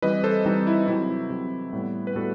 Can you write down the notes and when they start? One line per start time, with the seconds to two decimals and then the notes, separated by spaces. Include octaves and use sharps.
0.02 E3 G3 C4 B4 D#5
0.24 A4 C5
0.46 E3 G3 C4 D#4
0.67 E4
0.88 C3 F#3 C4 E4
1.30 C3 F#3 C4
1.73 A2 G3 B3
2.07 B4
2.15 A2 G3 B3 F#4 A4